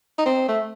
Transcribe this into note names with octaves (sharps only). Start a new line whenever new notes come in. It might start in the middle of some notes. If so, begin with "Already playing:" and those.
D#4
C4
A3